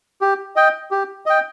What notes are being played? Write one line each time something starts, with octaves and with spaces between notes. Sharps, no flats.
G4
D#5 G5
G4
D#5 G5